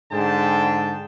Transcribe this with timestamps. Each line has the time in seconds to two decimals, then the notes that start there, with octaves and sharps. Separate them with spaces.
0.11 G#2 D3 G#4 G5 A5